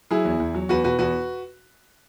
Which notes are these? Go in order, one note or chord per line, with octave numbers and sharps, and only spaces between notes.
F#3 E4 G#4
E2
E2
F#3
E2 F#4 B4
B2 F#4 B4
E2 F#4 B4